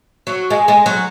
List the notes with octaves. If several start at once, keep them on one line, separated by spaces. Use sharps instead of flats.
F#3
G#3
G#3
F#3